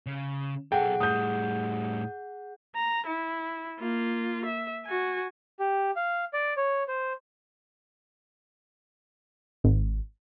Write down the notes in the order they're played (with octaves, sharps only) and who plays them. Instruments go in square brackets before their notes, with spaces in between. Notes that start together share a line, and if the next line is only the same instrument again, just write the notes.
[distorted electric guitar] C#3
[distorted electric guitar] B1 A4 [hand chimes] G#4 F#5 [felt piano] G5
[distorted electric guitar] A2 G3 [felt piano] D#6 G6
[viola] A#5
E4
A#3 F4
E5
F#4 G#5
[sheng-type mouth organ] G4
F5
D5
C#5
C5
[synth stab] G#1